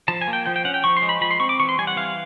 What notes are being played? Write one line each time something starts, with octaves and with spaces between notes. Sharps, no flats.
F3 A5
G#5
A#3
G5
F3 G5
G5
C#4 F#5
G5
F3 C#6
C6
G#3
B5
F3 B5
C6
C4 C#6
D6
E3 C#6
C6
G3 G#5
F#5
E3 F5